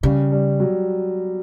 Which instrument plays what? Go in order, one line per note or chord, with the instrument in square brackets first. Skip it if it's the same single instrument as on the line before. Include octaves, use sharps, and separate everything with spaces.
[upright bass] C#3 [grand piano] G3
[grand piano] G3
F#3